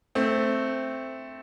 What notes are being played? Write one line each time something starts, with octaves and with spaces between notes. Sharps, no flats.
A3 C4